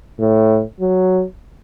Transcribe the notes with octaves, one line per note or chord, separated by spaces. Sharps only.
A2
F#3